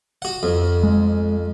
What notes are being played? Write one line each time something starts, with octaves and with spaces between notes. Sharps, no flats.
F#4 F#5
F2
G#3